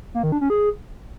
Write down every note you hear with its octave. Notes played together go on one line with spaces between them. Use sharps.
A#3
D#3
D4
C#4
G#4